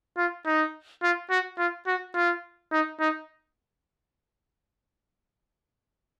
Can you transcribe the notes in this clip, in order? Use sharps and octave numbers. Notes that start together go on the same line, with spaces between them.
F4
D#4
F4
F#4
F4
F#4
F4
D#4
D#4